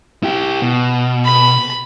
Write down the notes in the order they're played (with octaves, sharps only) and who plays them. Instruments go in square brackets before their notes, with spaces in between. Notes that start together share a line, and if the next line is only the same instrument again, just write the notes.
[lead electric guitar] E4 G4
B2
[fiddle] B5